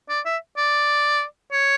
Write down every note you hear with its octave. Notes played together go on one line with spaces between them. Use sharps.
D5
E5
D5
C#5